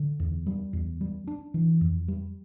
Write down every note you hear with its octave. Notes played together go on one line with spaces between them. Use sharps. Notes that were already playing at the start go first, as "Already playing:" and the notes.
Already playing: D3
E2
G3
E2
G3
D4
E3
F2
G3